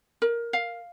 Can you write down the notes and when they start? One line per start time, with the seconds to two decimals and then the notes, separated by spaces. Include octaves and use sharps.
0.22 A#4
0.53 F5